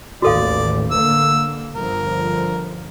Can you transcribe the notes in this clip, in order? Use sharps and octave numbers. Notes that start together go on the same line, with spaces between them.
A1 D#2 F#4 A4 D5 F5
D3 A#3 E6
G1 D3 F3 A#4